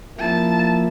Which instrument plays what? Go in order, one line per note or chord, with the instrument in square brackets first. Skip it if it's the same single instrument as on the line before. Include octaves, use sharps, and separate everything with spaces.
[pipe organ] F3 A#3 E4 [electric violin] A5